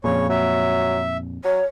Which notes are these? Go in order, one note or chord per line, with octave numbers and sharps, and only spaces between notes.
F2 A#2 C#3 C#5
F#3 E5
F#3 C#5